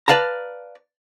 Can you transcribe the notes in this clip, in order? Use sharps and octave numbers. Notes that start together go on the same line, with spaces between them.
B4 D5 F5 A5 A#5